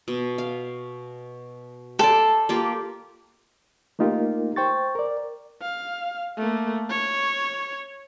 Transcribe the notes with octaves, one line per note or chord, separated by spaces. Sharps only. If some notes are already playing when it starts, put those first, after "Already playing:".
B2
F5
A4 C5 D5
A#3 F4 G4
A3 A#3 D#4 F4 G4 A#4
C5 G5 C#6 A6
A#4 D5
F5
A3 A#3
C#5